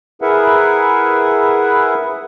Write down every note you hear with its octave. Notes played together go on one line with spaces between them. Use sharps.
E4 G#4 A#4 B4 E5 F#5